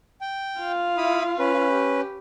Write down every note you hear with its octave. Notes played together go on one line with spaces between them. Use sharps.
G5
F4 F5
E4 B5 D#6
C#4 B4
G4